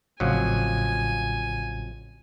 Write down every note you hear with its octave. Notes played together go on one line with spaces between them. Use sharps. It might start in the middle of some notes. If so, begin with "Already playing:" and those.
A1 F2 A2 C#3 F3 F#3 G#5